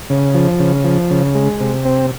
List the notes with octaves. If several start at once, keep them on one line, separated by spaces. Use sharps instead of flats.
C#3
F3
C#3
F3
C#3
G#3
C3
C4